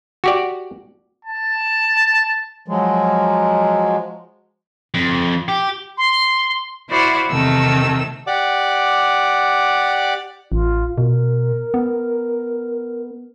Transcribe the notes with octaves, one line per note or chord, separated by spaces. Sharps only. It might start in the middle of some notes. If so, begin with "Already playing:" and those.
F#4 G4 D5
A5
F3 F#3 G#3
F2
G4
C6
E4 F#4 C5 D5 F5 B5
E2 C3 D#3 A3 E6
G4 D5 F#5 D6
A1 F4
B2 A#4
B3